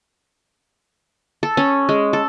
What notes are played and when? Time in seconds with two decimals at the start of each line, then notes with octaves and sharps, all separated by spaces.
1.43 A4
1.57 C#4
1.89 G#3
2.13 A4